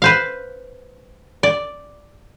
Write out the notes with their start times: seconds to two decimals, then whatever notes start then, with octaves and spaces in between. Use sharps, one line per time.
0.02 B4 C5 F5
1.43 D5